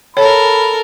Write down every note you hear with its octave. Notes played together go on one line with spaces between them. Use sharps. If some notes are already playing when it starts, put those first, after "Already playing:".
A4 A#4 C#5 B5